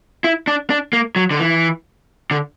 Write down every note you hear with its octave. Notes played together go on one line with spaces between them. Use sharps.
E4
D4
D4
A#3
F#3
D3
E3
D3